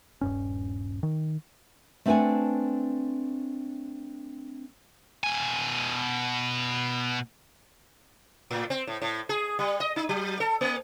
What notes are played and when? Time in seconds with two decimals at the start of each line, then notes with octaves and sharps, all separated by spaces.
0.21 D#1 G2 C#4
1.03 D#3
2.06 A3 C4 D4 B4 F#5 G#5
5.24 B2 G#5
8.51 A2
8.70 C4
8.87 A2
9.02 A2
9.29 G#4
9.59 G3
9.80 D#5
9.96 D#4
10.09 F#3
10.40 A4
10.61 A#3